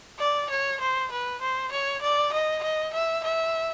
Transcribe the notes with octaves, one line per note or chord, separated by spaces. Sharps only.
D5
C#5
C5
B4
C5
C#5
D5
D#5
D#5
E5
E5